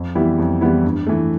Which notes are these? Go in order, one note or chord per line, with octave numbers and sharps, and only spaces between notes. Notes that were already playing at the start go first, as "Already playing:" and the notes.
Already playing: F2
E3 G3 B3 E4
F2
E3 G3 B3 E4
G2
E3 A3